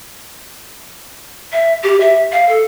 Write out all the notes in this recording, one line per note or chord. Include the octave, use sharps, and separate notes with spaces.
E5
G4
E5
F5
A4